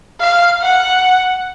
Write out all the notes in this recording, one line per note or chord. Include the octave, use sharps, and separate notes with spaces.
F5
F#5